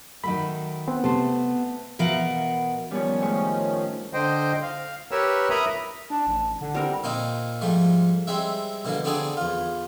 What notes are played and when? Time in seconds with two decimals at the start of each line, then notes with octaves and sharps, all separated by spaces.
0.24 D#3 F#3 A3 B5
0.88 B3 C4
1.04 C3 A3 C5
1.99 B2 E3 A#4 F5 F#5
2.91 D#3 F3 G3 B3 C#4 C#5
3.21 A2 G#3 C#6
4.14 D3 C5 D#5 G5
4.62 F5
5.11 G4 A#4 B4 C#5 E6
5.50 A#4 E5 A#5 B5 D#6
6.10 D4 A5
6.27 A1
6.61 D3 F#5
6.75 G3 C4 A#4
7.04 A#2 C4 D#4
7.61 G#2 F3 G3 A3
8.27 G3 G#3 C4 E5
8.85 B2 D3 E3 A#3
9.04 D3 B3 C4 D4 G#4 D5
9.37 E2 F4